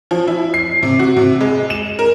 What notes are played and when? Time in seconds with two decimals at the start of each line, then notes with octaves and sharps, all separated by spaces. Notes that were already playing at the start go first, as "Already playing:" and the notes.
0.11 F3
0.27 E4
0.54 C7
0.83 C3
0.99 F#4
1.17 C3
1.41 G#3
1.70 E7
1.99 A#4